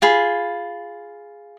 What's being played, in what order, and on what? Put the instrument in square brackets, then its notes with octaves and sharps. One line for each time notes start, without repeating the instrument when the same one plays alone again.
[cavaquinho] F4 G#4 B5